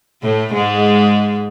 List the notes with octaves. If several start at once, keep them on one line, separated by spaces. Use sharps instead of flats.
A2 A3
G#2 G#3